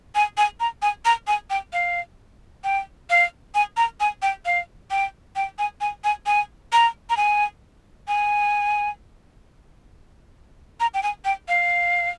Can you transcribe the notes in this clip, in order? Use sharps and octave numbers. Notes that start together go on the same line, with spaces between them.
G#5
G#5
A#5
G#5
A#5
G#5
G5
F5
G5
F5
G#5
A#5
G#5
G5
F5
G5
G5
G#5
G#5
G#5
G#5
A#5
A#5
G#5
G#5
A#5
G5
G#5
G5
F5